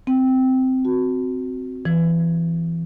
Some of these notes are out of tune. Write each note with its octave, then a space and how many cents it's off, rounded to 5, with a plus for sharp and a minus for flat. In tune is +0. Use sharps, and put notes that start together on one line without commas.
C4 -10
F#4 +0
E3 +20